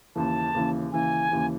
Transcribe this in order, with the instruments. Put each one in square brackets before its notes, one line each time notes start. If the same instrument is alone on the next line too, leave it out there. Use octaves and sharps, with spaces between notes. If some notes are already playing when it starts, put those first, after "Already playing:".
[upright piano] D#2 C#3 E3 [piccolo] A5
[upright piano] D#2 C#3 E3
[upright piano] D#2 C#3 E3 [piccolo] G#5
[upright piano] D#2 C#3 E3